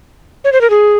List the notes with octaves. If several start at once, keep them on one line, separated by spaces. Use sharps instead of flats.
C#5
C5
A#4
G#4